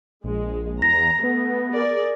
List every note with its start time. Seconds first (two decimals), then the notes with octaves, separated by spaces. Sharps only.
0.24 A#1 G#3
0.82 E2 A#5 A#6
1.23 A3 B3
1.72 G#4 A#4 D5